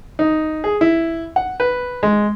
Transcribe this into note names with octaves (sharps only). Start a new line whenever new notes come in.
D#4
G#4
E4
F#5
B4
G#3